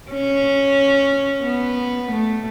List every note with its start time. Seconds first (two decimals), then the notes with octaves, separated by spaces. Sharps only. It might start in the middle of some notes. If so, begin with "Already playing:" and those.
0.11 C#4
1.44 B3
2.12 A3